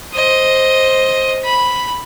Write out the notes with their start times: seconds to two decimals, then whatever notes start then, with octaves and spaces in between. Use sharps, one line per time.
0.13 C5 D#5
1.44 B5